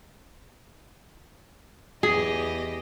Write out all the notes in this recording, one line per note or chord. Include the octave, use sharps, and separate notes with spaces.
E2 G4 G#4 D#5